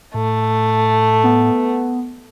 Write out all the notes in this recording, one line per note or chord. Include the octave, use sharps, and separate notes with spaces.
A2 A3
B3